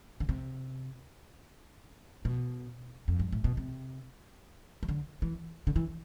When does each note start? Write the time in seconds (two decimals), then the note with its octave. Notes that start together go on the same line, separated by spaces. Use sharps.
0.20 D3
0.29 C3
2.25 B2
3.08 F2
3.19 G2
3.32 A2
3.44 B2
3.57 C3
4.83 E3
4.89 D3
5.22 E3
5.67 D3
5.76 E3